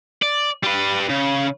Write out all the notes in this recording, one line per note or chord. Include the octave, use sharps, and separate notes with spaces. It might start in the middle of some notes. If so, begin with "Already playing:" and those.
D5
G3 B4
C#3